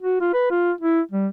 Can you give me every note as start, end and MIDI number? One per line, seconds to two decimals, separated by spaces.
0.03 0.20 66
0.21 0.32 65
0.34 0.49 71
0.50 0.72 65
0.81 1.00 64
1.11 1.27 55